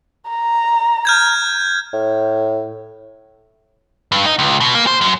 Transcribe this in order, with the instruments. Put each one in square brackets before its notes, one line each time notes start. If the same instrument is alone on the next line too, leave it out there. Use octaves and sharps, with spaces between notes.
[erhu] A#5
[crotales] F6 G6 G#6
[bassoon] A2
[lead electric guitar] G2
D#4
C#2
B2
A#3
C5
F#2